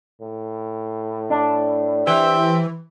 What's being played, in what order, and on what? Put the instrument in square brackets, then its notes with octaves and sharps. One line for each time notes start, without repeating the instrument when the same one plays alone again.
[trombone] A2
[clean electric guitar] D4
[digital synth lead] E3 [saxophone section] G4 E5 [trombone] C5